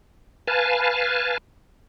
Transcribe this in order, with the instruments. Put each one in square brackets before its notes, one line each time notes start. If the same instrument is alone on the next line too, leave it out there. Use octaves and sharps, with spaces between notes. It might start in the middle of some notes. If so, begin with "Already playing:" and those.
[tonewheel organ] B4 F5 G#5 A5